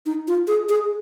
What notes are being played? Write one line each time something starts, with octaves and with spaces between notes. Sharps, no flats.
D#4
F4
G#4
G#4